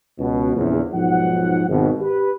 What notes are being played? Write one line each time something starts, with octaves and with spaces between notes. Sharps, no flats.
C#2 B2
A#1 E2 C#3
B1 G#2 F3 F#5
G#1 B2
G4 B4